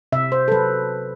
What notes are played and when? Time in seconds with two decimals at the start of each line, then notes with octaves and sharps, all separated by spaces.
0.12 C3 E5
0.32 C5
0.48 A4
0.52 F#3 B4